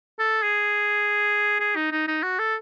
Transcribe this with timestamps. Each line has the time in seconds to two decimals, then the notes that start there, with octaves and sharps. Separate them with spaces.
0.19 A4
0.43 G#4
1.60 G#4
1.76 D#4
1.92 D#4
2.08 D#4
2.23 F#4
2.39 A4